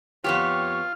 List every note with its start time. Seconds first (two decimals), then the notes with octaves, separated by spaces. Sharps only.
0.24 F2 B3 F4 G4 C#5